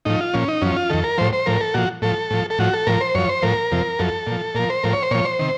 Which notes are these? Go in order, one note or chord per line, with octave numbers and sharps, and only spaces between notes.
A2 F3 D#4
F4
A#2 F3 C#4
D#4
F#2 F3 C#4
F4
F2 D#3 A4
A#4
A2 F3 C5
C5
A2 F3 A#4
A4
A#2 F3 F#4
A2 F3 A4
A2 F3
A4
A2 F3 F#4
A4
A2 F3 A#4
C5
F#2 F3 C#5
C5
A2 F3 A#4
F2 C3 F3
F#2 F3 A4
A#2
F3
A#2 F3 A#4
C5
A2 F3 A#4
C#5
C5
A#2 F3 C#5
C5
C3 D#3